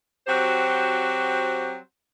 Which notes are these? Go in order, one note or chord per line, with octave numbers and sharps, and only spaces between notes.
F#3 C4 F#4 G4 C5